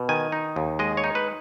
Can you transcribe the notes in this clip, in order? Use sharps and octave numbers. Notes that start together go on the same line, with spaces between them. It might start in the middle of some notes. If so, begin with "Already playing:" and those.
Already playing: B2
D#3 G#5
D#4
D#2
G#3 D#5
C#5
D#4
B4